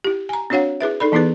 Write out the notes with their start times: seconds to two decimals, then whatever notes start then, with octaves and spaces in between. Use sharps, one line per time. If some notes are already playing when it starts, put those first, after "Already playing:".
0.04 E4 G4
0.29 G#5 A#5
0.50 C4 D4 F#4 C#5 F5 F#5
0.80 E4 G#4 B4 E5
1.00 D#4 A4 D5 B5
1.12 E3 B3 D#4 E4 G#4 B4